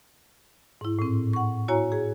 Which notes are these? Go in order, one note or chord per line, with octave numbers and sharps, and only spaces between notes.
G#2 E4
A2 C4
F#5 C#6
E4 F#4 C#5 G#5 A#5
G#4